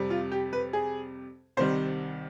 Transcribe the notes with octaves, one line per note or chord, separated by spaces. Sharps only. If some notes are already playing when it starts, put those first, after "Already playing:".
Already playing: F2 C3 G3
F4
G4
B4
G#4
C2 C3 D#3 G3 C5